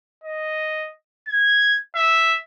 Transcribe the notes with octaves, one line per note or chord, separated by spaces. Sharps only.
D#5
G#6
E5